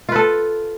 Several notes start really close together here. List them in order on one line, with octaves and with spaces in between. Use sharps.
F4 B4 A4